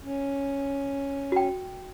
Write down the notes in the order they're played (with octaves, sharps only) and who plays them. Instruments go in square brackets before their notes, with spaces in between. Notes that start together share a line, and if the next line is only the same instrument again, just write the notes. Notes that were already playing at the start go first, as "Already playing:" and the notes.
[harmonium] C#4
[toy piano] F#4 G5